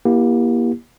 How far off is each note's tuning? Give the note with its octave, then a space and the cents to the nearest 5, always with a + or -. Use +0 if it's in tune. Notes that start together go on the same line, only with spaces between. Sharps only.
A#3 +35 E4 +0 G4 +0